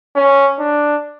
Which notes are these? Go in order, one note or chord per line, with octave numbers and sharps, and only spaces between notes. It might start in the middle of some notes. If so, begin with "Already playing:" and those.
C#4
D4